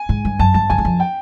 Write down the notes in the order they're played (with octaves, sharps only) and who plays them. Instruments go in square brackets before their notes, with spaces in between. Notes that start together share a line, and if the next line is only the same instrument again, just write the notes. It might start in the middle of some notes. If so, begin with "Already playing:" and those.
Already playing: [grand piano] G#5
[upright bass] G#2
G2
[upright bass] F#2 [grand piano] A5
[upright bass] G2 [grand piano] A5
[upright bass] F#2 [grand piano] G#5
[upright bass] E2
F2
[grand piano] G5